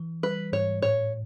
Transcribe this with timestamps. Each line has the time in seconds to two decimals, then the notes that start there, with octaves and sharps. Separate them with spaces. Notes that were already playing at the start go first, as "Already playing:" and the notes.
Already playing: E3
0.23 G3 B4
0.53 G#2 C#5
0.82 A2 C#5